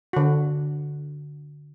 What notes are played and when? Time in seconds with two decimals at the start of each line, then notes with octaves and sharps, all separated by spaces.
0.13 D3 F#4